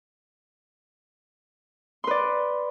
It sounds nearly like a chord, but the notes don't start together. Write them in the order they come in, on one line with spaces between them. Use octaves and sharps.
C6 B4 D5